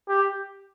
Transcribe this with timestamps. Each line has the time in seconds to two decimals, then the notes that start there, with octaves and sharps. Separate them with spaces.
0.08 G4